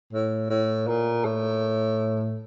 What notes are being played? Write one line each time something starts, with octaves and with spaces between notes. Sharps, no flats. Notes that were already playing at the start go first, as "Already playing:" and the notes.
A2
A2
A#2
A2